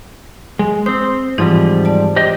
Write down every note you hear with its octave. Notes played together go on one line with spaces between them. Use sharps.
G#3
C4 C5 D#6
G#2 E3 F3 G3 C4 D#4
D5 A5
G4 C5 D#5